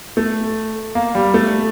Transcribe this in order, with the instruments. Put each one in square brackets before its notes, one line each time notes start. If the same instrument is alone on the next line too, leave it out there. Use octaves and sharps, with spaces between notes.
[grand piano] A3
A#3
G3
A3